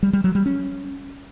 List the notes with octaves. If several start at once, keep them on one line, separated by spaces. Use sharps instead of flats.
G3
G3
F#3
G3
C#4